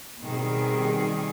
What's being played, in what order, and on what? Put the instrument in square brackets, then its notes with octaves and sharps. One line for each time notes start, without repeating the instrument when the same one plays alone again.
[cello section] B2 D#3 G3 C4 G#4